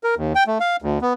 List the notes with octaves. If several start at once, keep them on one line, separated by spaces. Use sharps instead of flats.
A#4
D#2
G5
A3
F5
D2
B3